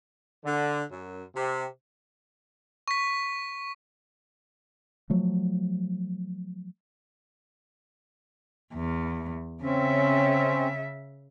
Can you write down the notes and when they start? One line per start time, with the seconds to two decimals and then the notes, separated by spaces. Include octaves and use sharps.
0.44 D3
0.91 F#2
1.35 C3
2.88 C#6 B6
5.10 F3 F#3 A3
8.74 E2
9.63 C#3 C4 C#4 E5